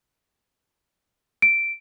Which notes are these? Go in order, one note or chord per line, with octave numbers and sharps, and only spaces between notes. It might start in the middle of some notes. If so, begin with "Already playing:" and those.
D7